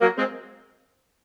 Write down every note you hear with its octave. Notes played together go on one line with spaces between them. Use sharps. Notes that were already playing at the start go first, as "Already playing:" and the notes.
F#3 A#3
G#3 C4